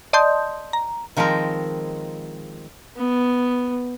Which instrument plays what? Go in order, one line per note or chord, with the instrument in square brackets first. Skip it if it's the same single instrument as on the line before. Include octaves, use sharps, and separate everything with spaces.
[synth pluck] D5 D#5 A5 C6 D#6 G6
A#5
[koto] D#3 F3 G#3 C4 A#4
[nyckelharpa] B3